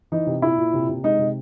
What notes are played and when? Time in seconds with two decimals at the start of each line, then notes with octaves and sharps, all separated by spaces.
0.12 E3 D#4
0.27 C3
0.42 A#2 E4
0.57 A#2
0.73 C3
0.89 C3
1.04 G#3 D#4
1.19 C3